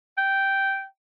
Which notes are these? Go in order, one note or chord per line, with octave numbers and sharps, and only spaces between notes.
G5